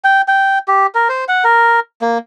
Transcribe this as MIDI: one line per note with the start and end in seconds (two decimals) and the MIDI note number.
0.04 0.21 79
0.28 0.59 79
0.68 0.87 67
0.95 1.08 70
1.09 1.24 72
1.28 1.44 78
1.44 1.80 70
2.02 2.18 58